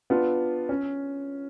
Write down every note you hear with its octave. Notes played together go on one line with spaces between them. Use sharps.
B3 D4 F4
C#4